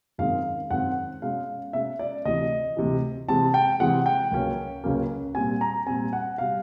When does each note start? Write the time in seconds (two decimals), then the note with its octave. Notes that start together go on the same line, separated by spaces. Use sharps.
0.18 F#2 D#3 G#3 C4 F5
0.70 F#2 D#3 G#3 C4 F#5
1.22 B2 G#3 C#4 F5
1.73 B2 G#3 C#4 E5
1.99 D5
2.25 D2 C3 E3 D#5
2.77 D2 C3 E3
3.28 C3 E3 G#3 C4 A5
3.54 G5
3.80 C3 E3 G#3 C4 F#5
4.06 G5
4.31 C#2 C#3 F#3 A#3 C#4
4.84 C#2 C#3 F#3 A#3 C#4
5.35 A#2 G3 C4 G#5
5.61 A#5
5.86 A#2 G3 C4 G#5
6.13 F#5
6.38 B2 G3 F5